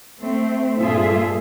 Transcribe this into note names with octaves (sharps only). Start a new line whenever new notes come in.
A3 C4
G2 A#2 F4 G#4 A4 E5